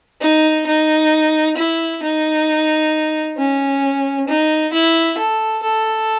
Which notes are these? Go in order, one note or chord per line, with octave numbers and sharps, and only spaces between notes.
D#4
D#4
E4
D#4
C#4
D#4
E4
A4
A4